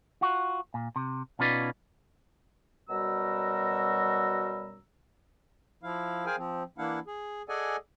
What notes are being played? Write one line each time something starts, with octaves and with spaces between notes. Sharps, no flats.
F4 F#4
A#2
C3
B2 C#4 D#4 F4 B4 D5
F#2 B2 G3 F#4 A#5 E6
F3 E4 F5
G#4 A#4 C5 F5 G5 G#5
F3 C4
E3 A#3 D4 E4 F5 F#5
G#4
G#4 A4 D5 D#5 F#5 G#5